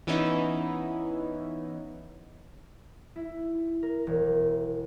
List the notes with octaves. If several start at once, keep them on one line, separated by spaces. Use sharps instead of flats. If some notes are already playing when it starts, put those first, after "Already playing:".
E3 B3 C#4 D#4 E4
E4
A#4
E1